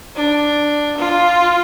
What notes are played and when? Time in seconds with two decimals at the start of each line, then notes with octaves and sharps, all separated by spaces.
0.16 D4
0.98 F4